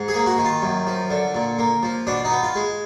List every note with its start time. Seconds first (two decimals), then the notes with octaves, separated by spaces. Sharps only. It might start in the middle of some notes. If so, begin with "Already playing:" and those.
Already playing: G#2
0.08 G#4
0.14 A#3
0.26 F#4
0.38 D#3
0.45 F4
0.62 F#2
0.87 F3
1.10 D3
1.34 A#2
1.59 A#3
1.83 F3
2.07 B2 D4
2.25 D#4
2.31 B3
2.43 F4
2.55 G#3